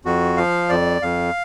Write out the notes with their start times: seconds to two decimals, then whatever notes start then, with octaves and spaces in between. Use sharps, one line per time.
0.05 F2 F#4
0.37 F3 F5
0.69 F2 D5
1.02 F2 F5